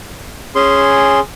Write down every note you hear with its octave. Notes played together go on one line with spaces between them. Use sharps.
C#4 G#4 C6